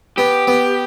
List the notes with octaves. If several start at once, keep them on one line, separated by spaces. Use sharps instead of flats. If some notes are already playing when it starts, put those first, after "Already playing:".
B3 G4
B3